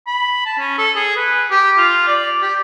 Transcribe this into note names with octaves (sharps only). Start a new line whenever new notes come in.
B5
A5
C#4
A4
G#4
B4
G4
F4
D5
G4